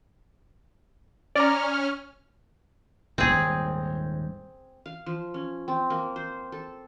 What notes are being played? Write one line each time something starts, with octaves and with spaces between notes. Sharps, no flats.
C#4 D5 A#5 F6
D#1 G#1 G#2 C4 G#4
F5
F3
C#4
C4
A#3
C5
A4